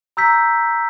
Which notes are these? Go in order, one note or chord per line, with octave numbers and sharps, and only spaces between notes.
A#5 E6 G6 B6